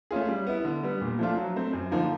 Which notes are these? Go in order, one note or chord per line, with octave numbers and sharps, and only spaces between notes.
A3 C#4 F4 G#4
G3
B3 E4
D3
G3 B3
A#2
F3 A3 D4 F4
F#3
A3 C4
F#2
D3 F3 A#3 D#4